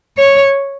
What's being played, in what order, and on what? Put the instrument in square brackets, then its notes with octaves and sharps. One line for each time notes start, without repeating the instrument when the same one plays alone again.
[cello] C#5